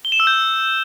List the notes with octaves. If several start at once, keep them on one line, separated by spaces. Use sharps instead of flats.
G7
E7
E6
G6